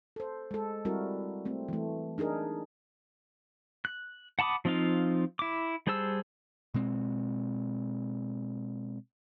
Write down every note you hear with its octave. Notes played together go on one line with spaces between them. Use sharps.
A4 C5
G#3 A4
G3 C4 E4 F#4 A#4
A3 C4
E3 A3
D4 D#4 G#4 A#4
F#6
F#5 A5 B5 D6 D#6
F3 C4 D#4 F4 F5
E4 D6
G3 G#4 C5 A5 E6
B2 G#3 C4